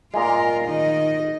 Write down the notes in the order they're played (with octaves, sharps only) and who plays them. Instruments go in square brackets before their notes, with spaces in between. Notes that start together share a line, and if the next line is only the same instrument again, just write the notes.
[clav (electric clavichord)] A#2 G#3 [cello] F4 A#4
[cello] D#3 D#5